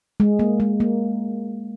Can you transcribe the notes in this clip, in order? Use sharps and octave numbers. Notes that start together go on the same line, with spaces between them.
G#3
A#3
G#3
A#3